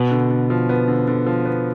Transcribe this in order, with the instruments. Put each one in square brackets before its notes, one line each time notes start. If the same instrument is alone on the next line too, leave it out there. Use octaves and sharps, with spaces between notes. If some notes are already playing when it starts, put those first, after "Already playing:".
Already playing: [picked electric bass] B2 [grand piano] B3
[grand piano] D3
D3
F3
B3
D3
D3
F3
B3